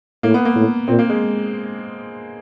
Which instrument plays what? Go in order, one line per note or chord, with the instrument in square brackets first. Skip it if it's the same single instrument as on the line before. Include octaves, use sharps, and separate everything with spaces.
[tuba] A2 [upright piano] A#3
[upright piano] B3
A#3
[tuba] A2
[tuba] A#2 [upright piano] C4
[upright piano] A#3
G#3